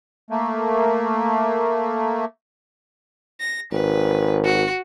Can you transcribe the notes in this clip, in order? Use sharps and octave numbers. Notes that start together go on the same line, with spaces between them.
A3 A#3
A#6
G#1 B4
F#4